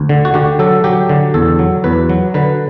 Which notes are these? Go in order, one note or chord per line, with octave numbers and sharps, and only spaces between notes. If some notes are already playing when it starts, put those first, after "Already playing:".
Already playing: D2
D3
F#4
D3 G4
F#3 A4
F#3 G4
D3
E2 A4
F#3
E2 B4
F#3
D3 B4